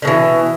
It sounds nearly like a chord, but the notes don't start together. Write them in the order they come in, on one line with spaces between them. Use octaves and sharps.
D3 B2 E3